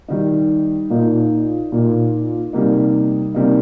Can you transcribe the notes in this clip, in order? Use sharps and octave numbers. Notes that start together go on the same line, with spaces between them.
D#3 G3 D#4
A#2 A#3 D#4
A#2 A#3 D#4
C3 G3 A#3 D#4
C3 G3 A#3 D#4